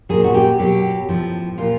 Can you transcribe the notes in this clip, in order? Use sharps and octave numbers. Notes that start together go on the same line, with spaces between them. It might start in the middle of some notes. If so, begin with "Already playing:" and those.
A#2 F#3 G#4
F#4
G4
B2 F#3 G4
A2 F3
A#2 F3 F4